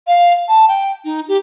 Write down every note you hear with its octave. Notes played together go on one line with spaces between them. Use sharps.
F5
A5
G5
D#4
G4